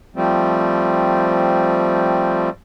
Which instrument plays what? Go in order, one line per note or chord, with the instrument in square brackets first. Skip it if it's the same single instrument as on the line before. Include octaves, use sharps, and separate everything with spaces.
[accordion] F3 G3 A3 C4